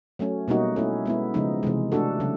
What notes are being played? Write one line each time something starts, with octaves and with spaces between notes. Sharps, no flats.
F#3 A3 C#4
B2 G3 A#3 D#4 F#4
A3 C#4 E4
G#3 B3 E4
C#3 F3 G#3 B3 D#4
C3 E3 G#3
A3 D4 F#4 A4
C#3 F#3